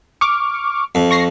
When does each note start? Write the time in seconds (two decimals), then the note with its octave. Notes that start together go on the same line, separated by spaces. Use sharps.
0.21 C#6 D6 F6
0.95 F2
1.11 C#6 A#6 C7